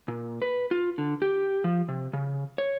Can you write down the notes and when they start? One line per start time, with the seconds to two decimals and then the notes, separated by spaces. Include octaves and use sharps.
0.08 A#2
0.42 B4
0.71 F4
0.98 D3
1.22 G4
1.64 F3
1.89 C3
2.13 C#3
2.58 C#5